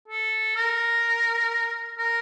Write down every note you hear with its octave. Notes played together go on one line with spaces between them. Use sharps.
A4
A#4
A#4